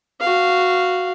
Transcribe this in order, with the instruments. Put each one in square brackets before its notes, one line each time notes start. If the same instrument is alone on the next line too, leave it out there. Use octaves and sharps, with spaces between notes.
[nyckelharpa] F#4 F5